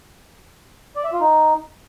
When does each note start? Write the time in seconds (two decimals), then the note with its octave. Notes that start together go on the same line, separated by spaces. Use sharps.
0.96 D5
1.04 E5
1.12 F4
1.21 D#4